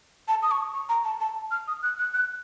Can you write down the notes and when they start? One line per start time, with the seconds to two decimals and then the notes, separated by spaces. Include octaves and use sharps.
0.28 A5
0.43 D#6
0.51 C#6
0.74 C#6
0.89 A#5
1.05 A5
1.20 A5
1.51 F6
1.68 D#6
1.83 F#6
1.99 F#6
2.14 F#6